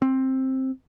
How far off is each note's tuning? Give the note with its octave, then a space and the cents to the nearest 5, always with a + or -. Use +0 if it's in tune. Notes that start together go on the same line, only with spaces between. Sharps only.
C4 +10